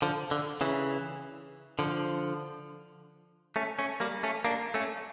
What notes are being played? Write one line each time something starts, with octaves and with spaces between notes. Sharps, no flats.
D3 F3
D3
C#3 E3
D3 F3
A3 C#4
A3 C#4
G3 A#3
A3 C#4
A#3 D4
A3 C#4